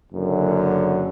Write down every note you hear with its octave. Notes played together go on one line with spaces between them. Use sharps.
F#1 F#2 D3